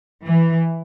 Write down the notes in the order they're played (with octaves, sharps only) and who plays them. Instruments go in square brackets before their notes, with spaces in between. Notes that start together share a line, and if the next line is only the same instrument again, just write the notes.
[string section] E3